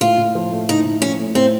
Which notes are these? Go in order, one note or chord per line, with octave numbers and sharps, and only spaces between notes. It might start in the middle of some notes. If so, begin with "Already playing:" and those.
A2 F4
A2
F3
A3
A2 D#4
A2
F3 C#4
A3
A2 C4